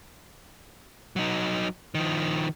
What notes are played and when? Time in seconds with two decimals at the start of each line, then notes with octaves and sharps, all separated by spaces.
1.16 F#3 D#4
1.95 D#3 F3